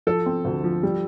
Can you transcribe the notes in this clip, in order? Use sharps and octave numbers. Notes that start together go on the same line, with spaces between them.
F3 A4
C4
D2
F3
G3